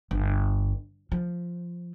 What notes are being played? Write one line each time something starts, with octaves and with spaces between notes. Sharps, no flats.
G1
F3